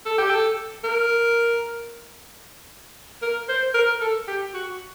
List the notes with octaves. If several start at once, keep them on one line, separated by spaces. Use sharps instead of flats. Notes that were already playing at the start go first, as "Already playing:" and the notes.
A4
G4
A4
A#4
A#4
C5
A#4
A4
G4
F#4